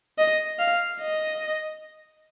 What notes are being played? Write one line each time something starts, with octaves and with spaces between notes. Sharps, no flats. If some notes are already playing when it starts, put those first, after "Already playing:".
D#5
F5
D#5